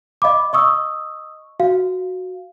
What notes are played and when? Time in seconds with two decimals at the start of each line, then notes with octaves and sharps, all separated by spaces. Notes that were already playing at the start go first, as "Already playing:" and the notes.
0.22 D#5 F5 B5 D6
0.53 D#5 C#6 D#6 E6
1.60 F#4 F5